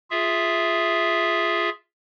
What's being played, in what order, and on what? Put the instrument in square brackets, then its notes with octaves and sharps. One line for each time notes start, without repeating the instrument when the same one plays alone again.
[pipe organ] F4 G#4 E5